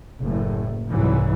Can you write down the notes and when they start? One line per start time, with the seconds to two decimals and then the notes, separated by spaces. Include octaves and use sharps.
0.21 F#1 A2
0.89 C2 G#2 E3 F#3